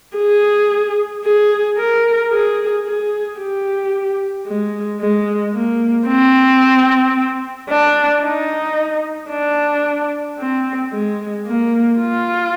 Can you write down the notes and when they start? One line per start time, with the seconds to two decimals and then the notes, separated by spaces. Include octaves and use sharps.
0.17 G#4
1.24 G#4
1.78 A#4
2.31 G#4
2.85 G#4
3.39 G4
4.47 G#3
5.01 G#3
5.54 A#3
6.08 C4
7.70 D4
8.23 D#4
9.31 D4
10.39 C4
10.93 G#3
11.46 A#3
12.00 F4